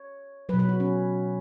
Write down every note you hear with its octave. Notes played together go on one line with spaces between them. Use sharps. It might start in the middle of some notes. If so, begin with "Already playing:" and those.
Already playing: C#5
B2 F#3 B4
B4
F#4
C#4